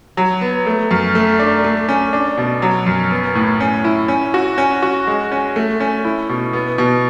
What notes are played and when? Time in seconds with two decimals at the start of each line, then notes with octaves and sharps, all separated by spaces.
0.17 F#3
0.41 B3
0.66 A3
0.91 F#2
1.15 A3
1.39 D4
1.64 A3
1.89 C#4
2.13 D4
2.37 B2
2.62 F#3
2.86 F#2
3.11 B3
3.35 A2
3.60 C#4
3.84 E4
4.08 C#4
4.34 F#4
4.58 C#4
4.83 F#4
5.07 G#3
5.32 C#4
5.56 A3
5.80 C#4
6.04 E4
6.29 B2
6.53 B3
6.78 B2